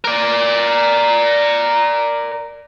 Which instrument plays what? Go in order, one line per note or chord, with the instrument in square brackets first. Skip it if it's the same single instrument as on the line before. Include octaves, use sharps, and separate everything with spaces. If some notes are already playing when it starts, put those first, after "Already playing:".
[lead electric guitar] A#4 D5